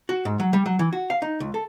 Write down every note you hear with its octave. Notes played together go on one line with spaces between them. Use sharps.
F#4
G#2
F#3
G3
F#3
E3
F#4
F5
D#4
C#2
A4